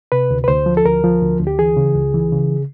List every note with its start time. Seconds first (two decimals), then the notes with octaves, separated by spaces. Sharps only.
0.12 C3 B4
0.30 D2
0.44 B4
0.48 D2 C5
0.66 F3
0.77 A4
0.85 D2 A#4
1.04 F3
1.21 D2
1.40 D2
1.47 G4
1.59 E3 G#4
1.77 C#3
1.95 C#2
2.14 E3
2.32 C#3